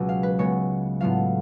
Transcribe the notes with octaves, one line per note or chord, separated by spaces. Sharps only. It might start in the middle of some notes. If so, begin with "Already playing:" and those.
Already playing: C#2 B2 F#3 C#4 F4
F5
B4
C#3 G#3 B3 C#5
A2 F#3 B3 F4 F5